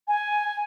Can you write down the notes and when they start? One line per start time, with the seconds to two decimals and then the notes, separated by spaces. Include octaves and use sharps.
0.08 G#5